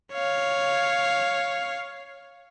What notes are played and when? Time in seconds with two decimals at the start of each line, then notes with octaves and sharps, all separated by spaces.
0.13 C#5 F5